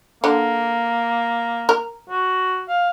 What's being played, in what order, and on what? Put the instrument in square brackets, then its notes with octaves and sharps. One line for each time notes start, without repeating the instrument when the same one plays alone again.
[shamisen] D3 [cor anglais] A#3
[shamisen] A#4
[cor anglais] F#4
F5